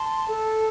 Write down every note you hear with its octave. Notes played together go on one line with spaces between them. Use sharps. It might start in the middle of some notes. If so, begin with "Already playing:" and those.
Already playing: A5 C6
A4